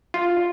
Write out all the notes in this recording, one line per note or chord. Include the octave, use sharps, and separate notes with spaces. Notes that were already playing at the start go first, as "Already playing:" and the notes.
F4